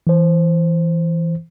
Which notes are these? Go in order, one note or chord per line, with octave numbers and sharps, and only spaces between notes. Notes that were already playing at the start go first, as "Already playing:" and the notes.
E3 C5